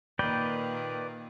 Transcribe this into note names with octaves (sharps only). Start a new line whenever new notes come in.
A#2 D#3 A#3 B4 D5 G5